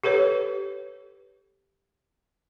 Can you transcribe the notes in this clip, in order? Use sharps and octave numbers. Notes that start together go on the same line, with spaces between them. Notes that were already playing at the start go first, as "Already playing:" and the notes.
G4 A4 B4 C#5